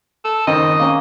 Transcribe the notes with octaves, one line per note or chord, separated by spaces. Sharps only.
A4
F#1 D#3 C4 D#5
A#3 C#4